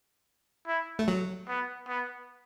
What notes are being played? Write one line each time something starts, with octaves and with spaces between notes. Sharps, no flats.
E4
A3
F#3
B3
B3